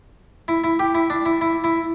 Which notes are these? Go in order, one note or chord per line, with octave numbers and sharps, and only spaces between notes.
E4
E4
G4
E4
D4
E4
E4
E4